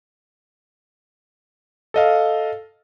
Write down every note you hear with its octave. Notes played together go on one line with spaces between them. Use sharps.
A4 D#5 F5